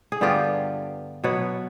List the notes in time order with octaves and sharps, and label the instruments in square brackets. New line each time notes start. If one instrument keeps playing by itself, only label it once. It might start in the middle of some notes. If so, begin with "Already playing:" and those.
[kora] G#4
G2 D3 G3 B3 F4 G4
B2 F#3 B3 B4 C#5